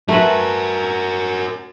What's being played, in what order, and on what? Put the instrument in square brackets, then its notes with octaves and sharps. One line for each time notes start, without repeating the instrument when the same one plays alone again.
[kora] A3 B4 [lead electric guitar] F#4 A#4